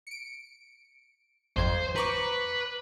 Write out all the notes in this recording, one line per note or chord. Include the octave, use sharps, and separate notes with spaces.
C#7 D7
G#1 F2 C5 G#6
B4 A#5 C#6 D6